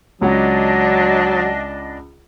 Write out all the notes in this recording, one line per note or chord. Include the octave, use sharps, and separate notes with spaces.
C#2 F#3 D4 D#5 F#5